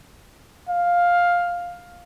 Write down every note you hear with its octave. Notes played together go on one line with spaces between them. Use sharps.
F5